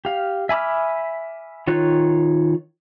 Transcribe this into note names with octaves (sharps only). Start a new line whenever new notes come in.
G4 F5
E5 G#5 B5 D6 F6
D#3 F4 C#5 F#6